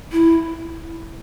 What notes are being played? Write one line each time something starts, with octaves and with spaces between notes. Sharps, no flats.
E4